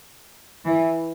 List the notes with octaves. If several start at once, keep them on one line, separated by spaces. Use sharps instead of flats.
E3